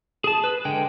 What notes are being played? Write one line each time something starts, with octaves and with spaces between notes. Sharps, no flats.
G#4 A5
B4
D3 G#3 G5